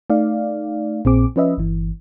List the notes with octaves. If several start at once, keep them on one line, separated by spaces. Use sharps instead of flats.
A3 D#4 D5 F5
A#1 A#2 C4 G#4 D6
F3 C#4 B4 D#5 E5
G1 E3